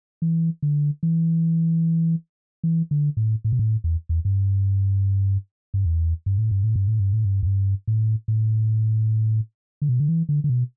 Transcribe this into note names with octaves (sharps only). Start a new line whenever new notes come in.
E3
D3
E3
E3
D3
A2
A2
B2
A2
E2
E2
G2
G2
E2
G2
A2
G2
A2
G2
A2
G2
A2
G2
E2
G2
A2
A2
D3
B2
D3
E3
D3
D3
B2